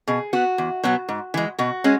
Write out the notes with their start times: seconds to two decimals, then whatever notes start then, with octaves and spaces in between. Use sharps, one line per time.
0.08 B2 G#4
0.33 B3 F#4
0.58 E2
0.83 B2 F#3 B3
1.09 G#2
1.34 E3 G#3
1.58 B2 F#4
1.84 G#3 C#4